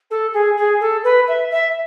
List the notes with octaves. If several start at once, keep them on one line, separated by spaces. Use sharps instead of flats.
A4
G#4
G#4
A4
B4
E5
E5